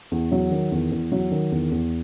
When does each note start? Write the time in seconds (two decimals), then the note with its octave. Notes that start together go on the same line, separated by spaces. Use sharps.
0.11 E2
0.31 F#3
0.51 D#3
0.71 E2
0.91 E2
1.12 F#3
1.32 D#3
1.51 E2
1.71 E2